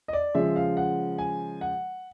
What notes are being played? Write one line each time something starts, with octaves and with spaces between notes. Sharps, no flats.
D#5
D5
C#3 F3 G#3 E5
F5
F#5
G#5
F#5